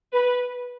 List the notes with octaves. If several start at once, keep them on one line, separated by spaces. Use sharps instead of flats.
B4